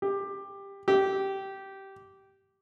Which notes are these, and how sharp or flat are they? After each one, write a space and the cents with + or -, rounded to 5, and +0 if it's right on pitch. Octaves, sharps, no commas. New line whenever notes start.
G4 +15
G4 -15